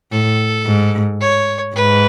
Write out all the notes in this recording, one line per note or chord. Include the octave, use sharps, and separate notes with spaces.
A2 A4
G#2
C#5
G#2 B4